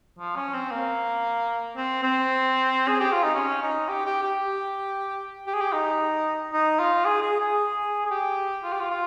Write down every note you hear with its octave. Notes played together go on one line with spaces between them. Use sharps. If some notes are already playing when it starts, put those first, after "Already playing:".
F3
C#4
C4
A#3
C4
C4
G#4
G4
F4
D#4
C#4
D#4
G4
G4
G4
G4
G#4
G4
D#4
D#4
F4
G#4
G#4
G#4
G#4
G4
F4
G4
F4
F4